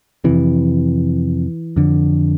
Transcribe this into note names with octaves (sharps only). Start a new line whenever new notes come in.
F2 C3 E3
F2 D3